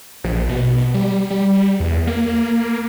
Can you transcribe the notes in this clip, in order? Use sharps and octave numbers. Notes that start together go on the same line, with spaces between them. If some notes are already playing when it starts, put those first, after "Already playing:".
A#1
B2
G3
G3
E2
A#3